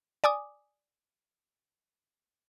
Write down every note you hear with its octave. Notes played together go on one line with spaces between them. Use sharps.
D5 G#5 D6 D#6